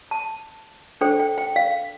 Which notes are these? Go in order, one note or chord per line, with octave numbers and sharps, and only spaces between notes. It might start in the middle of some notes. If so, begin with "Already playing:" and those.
A5
D4 A4 C5 G5
G5
G5
F5